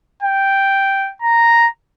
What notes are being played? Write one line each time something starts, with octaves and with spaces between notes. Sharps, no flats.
G5
A#5